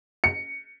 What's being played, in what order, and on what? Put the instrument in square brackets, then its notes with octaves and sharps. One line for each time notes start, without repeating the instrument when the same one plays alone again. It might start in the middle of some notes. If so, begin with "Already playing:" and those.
[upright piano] C#7